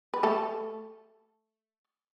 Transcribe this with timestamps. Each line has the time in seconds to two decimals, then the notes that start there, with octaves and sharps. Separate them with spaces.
0.14 B4
0.23 A3 A4